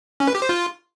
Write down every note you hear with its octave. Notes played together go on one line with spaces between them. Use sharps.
C#4
B4
G4
C5
F4